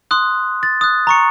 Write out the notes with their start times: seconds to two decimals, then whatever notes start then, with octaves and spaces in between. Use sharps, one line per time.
0.11 C6 D#6 F#6
0.63 A6
0.81 D#6 F#6
1.07 A#5 C#6 C#7